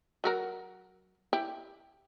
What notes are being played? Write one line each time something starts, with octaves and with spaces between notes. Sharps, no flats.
F#3 F#4 A#4
E4 G4